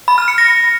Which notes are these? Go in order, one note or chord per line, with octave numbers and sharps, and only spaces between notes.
B5
F6
C#7
A#6